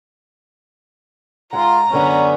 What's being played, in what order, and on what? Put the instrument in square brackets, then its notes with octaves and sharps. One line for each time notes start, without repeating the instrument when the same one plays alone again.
[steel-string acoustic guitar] G#2 G#3 F#5 [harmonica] F4 [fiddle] A#5
[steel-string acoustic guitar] F#2 D3 F#5 [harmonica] B3 C#4